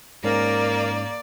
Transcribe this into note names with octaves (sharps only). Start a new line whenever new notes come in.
G#2 A#3 C#4 A#4 D5